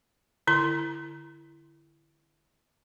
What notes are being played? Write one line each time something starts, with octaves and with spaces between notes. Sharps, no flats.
D3 E4 C6